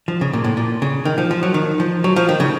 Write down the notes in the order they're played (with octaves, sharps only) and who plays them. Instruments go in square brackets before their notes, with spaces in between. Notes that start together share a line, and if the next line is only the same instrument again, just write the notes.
[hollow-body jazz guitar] F3
C#3
A#2
A2
A#2
C#3
D#3
F3
F3
F#3
D#3
F3
F#3
F3
D#3
C#3